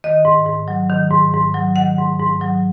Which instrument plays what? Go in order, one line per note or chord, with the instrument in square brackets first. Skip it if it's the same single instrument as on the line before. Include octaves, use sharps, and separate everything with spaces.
[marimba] D#3 D#5
G#2
G#2
F#3
D#3
G#2
G#2
F#3
D#3 F#5
G#2
G#2
F#3